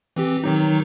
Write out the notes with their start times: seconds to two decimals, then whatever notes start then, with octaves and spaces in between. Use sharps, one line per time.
0.16 E3 C4 G4
0.44 D#3 F#3 D#4